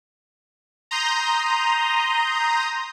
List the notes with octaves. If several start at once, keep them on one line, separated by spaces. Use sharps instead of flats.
A#5 C6 D#6 G6